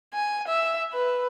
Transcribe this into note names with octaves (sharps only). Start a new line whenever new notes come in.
G#5
E5
B4